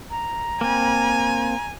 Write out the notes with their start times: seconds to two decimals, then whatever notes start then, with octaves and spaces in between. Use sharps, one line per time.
0.10 A#5
0.61 A#3 C4 G#5